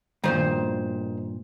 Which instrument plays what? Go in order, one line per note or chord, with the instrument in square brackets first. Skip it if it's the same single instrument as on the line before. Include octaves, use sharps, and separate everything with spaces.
[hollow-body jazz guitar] G2 A#2 [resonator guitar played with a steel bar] D#3 C5